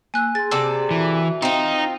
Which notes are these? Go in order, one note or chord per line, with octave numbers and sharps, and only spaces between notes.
A#3 G#5 E6 F#6
G#4 C6 A6
C3 A4 D5 A5 E6
E3 F#4 E5
C4 D#4 F4